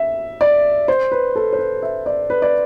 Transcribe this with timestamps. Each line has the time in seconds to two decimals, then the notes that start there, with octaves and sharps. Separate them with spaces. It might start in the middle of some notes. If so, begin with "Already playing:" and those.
Already playing: E5
0.41 D5
0.88 C5
1.12 B4
1.36 A4
1.53 C5
1.59 B4
1.83 E5
2.06 D5
2.30 B4
2.42 D5